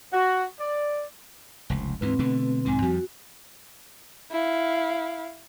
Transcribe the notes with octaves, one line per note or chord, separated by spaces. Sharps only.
F#4
D5
F1 C#2
D2 G#2 E3 C4 B4
B2 D3 A3
B1 G#2 D#3 C4 G#5
F2 F3 G3 F#4
E4 F5